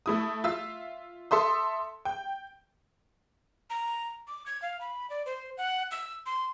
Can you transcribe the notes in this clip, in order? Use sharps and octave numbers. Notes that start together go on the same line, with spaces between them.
A3 E4 D#6
F4 E5 E6
A4 E5 C6 D#6
G5
A#5
D6
G#6
F5
B5
D5
C5
F#5
E6
C6